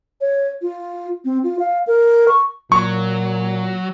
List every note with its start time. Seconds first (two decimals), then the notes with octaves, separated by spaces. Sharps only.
0.21 C#5
0.62 F4
1.25 C4
1.44 F4
1.59 F5
1.87 A#4
2.28 C#6
2.72 A#2 F#3 C#6